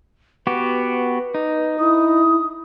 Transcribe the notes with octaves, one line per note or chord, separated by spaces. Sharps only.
B3 F#4 G4 B4
D#4
E4 D#6